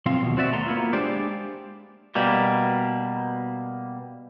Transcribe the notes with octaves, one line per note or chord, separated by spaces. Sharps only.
B1 F3 C4 F5 C6
D#2 B2
C4 F#4 D5 E5
A3 B3 A4 A#5 C6
A#3 B3 E4 F4
G#3 D4 G4 C5 D5
B2 G3 A#3